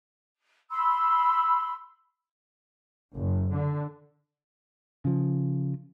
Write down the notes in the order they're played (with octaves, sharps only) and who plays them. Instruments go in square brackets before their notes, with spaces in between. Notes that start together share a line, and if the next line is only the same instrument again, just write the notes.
[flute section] B5 C6 E6
[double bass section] F#1
D3
[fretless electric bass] C#3 F3